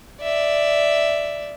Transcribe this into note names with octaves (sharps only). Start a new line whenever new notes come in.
D5 E5